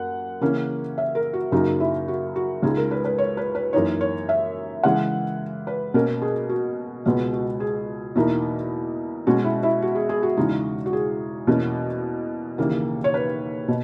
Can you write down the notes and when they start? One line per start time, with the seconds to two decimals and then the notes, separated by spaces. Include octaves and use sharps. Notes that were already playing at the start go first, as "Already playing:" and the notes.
Already playing: F#2 A#3 F#5
0.41 C#3 E3 A#3 C#4
0.98 E5
1.15 A#4
1.33 F#4
1.52 F#2 C#3 F#3 A#3 D#4 F#4
1.80 E4
2.08 F#4
2.36 F#4
2.62 C#2 C#3 G#3 D#4 G#4
2.77 A#4
2.91 B4
3.05 B4
3.18 C#5
3.37 B4
3.55 B4
3.73 F#2 E3 A#3 D#4 C#5
4.01 C#5
4.29 E5
4.83 C#3 E3 G#3 F#5
5.67 B4
5.94 B2 A#3 C#4 A#4
6.22 G#4
6.49 F#4
7.05 C#2 B2 G#3 B3 F#4
7.33 F#4
7.60 G#4
8.15 E2 B2 A#3 D#4 E4
9.27 B2 G#3 C#4 F#4
9.44 E4
9.63 E4
9.82 F#4
9.95 G#4
10.09 G#4
10.23 F#4
10.37 E2 C#3 G#3 D#4
10.86 F#4
10.93 G#4
11.47 E2 B2 A#3 C#4
12.58 D#2 C#3 E3 A#3
13.04 C#5
13.14 B4
13.68 B2